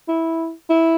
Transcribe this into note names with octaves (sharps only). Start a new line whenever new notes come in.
E4
E4